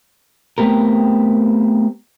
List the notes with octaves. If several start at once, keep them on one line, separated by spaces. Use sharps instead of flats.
A3 B3 C4 G4 A#4